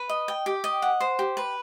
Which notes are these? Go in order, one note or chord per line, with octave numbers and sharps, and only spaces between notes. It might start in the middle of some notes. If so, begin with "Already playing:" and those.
Already playing: B4
D#5
G5
G4
D#5
F#5
C5
G4
B4